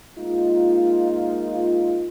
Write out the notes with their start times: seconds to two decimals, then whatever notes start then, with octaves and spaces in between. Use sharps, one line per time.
0.19 G#3 A#3 D#4 F4